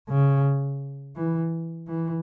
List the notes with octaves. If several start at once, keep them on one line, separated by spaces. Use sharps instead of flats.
C#3
E3
E3